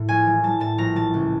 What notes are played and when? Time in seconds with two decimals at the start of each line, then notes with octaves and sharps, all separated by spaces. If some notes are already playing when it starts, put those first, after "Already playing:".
Already playing: A2
0.09 A#1 G#5
0.26 E3
0.43 G3 A5
0.60 A2 A5
0.78 A#1 A#5
0.96 E3 A5
1.14 C#2